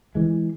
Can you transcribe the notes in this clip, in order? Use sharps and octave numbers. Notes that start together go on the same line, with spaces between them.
E3 G#3